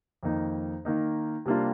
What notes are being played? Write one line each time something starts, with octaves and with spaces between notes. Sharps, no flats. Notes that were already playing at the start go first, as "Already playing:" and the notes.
F2 D#3 A#3 D#4
D#3 A#3 D#4
C3 G3 A#3 D4 F4